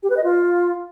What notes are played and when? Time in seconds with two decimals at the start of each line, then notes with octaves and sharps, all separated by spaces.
0.03 G4
0.10 B4
0.17 D#5
0.24 F4